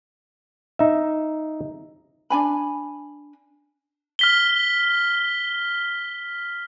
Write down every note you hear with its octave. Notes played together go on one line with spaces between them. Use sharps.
D#4 E5
D4 G#5 B5
F6 B6 G7